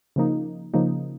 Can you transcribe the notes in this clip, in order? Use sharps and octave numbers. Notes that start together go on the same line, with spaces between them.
C#3 F3 A#3 D#4
C#3 F3 A#3 D#4